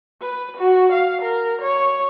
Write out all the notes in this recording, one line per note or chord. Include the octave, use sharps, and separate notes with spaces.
B4
F#4
F5
A#4
C#5